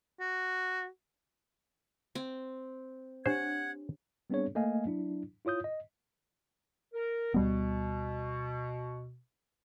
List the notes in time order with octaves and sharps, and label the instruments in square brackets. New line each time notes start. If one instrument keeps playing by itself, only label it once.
[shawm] F#4
[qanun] C4
[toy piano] D4 G4 C#5 [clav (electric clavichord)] C5 [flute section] F#5 F#6 G#6
[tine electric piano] G3 B3 C4 D4 G#4 C#5
A3 A#3 A4 D#5 F5 G#5
F#3 D4 E4
E4 F4 C#5 D#6 G6
D#5
[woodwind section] A#4
[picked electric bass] D2 G3 B3 [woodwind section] B2